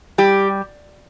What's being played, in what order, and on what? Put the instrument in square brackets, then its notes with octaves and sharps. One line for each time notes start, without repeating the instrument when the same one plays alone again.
[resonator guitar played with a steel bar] G3 G4